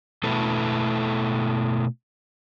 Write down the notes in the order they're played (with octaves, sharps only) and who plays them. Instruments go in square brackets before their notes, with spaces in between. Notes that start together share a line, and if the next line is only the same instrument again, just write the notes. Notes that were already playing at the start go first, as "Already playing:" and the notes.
[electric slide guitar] B2 A3 B3 E4 A4